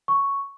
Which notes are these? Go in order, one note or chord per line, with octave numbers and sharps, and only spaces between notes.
C#6